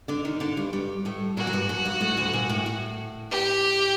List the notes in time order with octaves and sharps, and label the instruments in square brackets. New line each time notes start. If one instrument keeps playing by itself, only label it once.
[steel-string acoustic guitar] D3 D4
D#3 D#4
D3 D4
G2 G3
G2 G3
A2 A3
[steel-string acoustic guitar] A#2 A#3 [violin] F#4
[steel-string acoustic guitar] F#3
G2 G3
F#2 F#3
G2 G3
A2 A3
D2 D3
A#2
A2
A2
[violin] G4